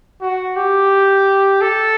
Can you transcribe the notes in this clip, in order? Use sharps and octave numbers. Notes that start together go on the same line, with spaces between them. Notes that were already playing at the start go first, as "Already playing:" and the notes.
F#4
G4
A4